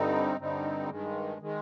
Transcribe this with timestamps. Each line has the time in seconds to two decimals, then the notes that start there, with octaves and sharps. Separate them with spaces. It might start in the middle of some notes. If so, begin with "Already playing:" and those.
Already playing: G2 D3 G3 C4 D#4
0.38 G2 D3 G3 C4 D#4
0.89 G2 D#3 G#3
1.41 D#3 G#3